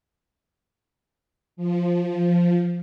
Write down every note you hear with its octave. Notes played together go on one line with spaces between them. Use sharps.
F3